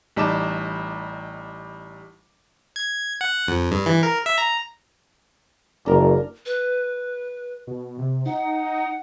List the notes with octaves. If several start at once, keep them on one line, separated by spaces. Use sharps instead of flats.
A1 G3 D#4 A5 D6 E7
G#6
F#5
F2
G2
E3
A#4
E5
A#5
F#1 D4 A#4
B4
B2
C3
D#4 F#5